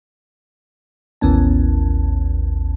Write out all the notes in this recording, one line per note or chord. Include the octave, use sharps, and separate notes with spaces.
A1 D#2 B3 C#4 A5